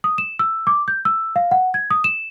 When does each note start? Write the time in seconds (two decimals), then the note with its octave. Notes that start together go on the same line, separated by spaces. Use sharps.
0.04 D#6
0.18 E7
0.39 E6
0.67 D6
0.88 G6
1.05 E6
1.36 F5
1.51 F#5
1.74 G#6
1.91 D#6
2.04 E7